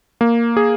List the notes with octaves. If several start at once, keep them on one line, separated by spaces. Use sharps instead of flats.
A#3
G#4